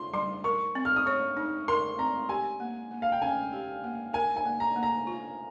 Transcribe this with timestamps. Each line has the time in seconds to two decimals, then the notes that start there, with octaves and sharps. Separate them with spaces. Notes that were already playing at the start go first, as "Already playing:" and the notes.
Already playing: F4 C6
0.13 G3 C6
0.44 A#4 C#6
0.75 C4
0.85 F6
0.96 D#6
1.06 C#5 C#6
1.37 D#4
1.68 A#4 C6
1.99 C4 A#5
2.29 G4 G#5
2.60 A#3
2.91 A#3
3.02 F5
3.12 G5
3.21 C#4 G#5
3.53 G4
3.84 A#3
4.13 A#4 G#5
4.37 G#5
4.45 A#3
4.60 A#5
4.76 A#3
4.83 A#5
5.07 F4